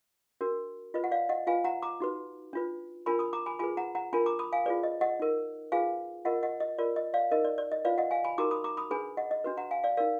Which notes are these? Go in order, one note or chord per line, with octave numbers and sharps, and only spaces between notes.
D4 F#4 A#4
F4 B4 D#5
F#5
D5 F5
D#5 F#5
F4 B4 F5 G#5
F#5 A#5
A#5 D6
D#4 F#4 B4
D4 F4 B4
D4 F4 A#4 G#5 B5
B5 D#6
A#5 D6
G#5 B5
F4 G#4 B4 G#5 B5
F#5 A#5
F#5 A#5
D4 F4 A#4 G#5 B5
A#5 D6
B5 D#6
F5 G#5
F4 G#4 B4 D5
D#5
D#5 F#5
D#4 A#4
F4 G#4 B4 F5 G#5
F4 A#4 D#5 F#5
D#5 F#5
D#5
F4 A#4 D5
D#5
D5 F5
D#4 A#4 D#5
D5
D5
D#5
F4 B4 D5 F5
D#5 F#5
F5 G#5
G#5 B5
D#4 F#4 A#4 A#5 D6
B5 D#6
A#5 D6
B5 D#6
D4 G#4 B4 G#5 B5
D#5 F#5
D#5
D4 F#4 B4
F#5 A#5
F5 G#5
D5 F5
D#4 A#4 D5 F5